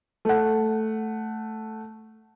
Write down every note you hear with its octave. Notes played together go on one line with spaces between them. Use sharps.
A3 F#5